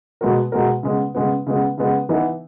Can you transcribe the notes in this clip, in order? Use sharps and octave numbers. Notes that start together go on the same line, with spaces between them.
B2 G#3 B3 F#4 A#4
B2 G#3 B3 F#4 A#4
C#3 G#3 B3
C#3 G#3 B3
C#3 G#3 B3
C#3 G#3 B3
E3 B3 D#4